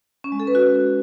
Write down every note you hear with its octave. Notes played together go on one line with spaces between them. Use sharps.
C#4
G#3
A4
B4
F#4